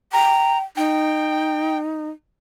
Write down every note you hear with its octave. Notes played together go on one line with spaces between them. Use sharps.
G5 A#5
D#4 G5